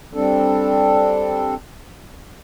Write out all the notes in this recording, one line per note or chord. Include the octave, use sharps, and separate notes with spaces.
G3 C4 D4 A4